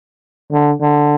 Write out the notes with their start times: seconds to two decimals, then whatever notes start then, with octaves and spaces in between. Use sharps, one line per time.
0.52 D3
0.81 D3